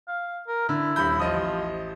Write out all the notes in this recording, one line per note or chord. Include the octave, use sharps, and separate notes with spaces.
F5
A#4
D3 E4
D#1 B5 G6
A1 F3 D#5 D#6